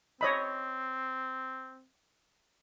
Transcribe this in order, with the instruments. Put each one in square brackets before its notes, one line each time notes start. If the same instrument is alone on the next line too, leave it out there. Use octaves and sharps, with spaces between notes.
[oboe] C4 [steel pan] C#5 D#5 B5